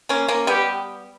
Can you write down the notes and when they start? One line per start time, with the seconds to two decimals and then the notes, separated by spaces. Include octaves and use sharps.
0.09 A#3 C#4
0.28 A#3 C#4
0.47 G3 B3 G4